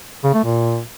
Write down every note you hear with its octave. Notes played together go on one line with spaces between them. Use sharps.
C#3
A3
A#2